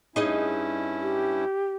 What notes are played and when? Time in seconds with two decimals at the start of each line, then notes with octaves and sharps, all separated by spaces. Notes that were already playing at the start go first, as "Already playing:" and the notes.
0.16 G2 C#4 D#4 E4 G#4 D#5
1.01 G4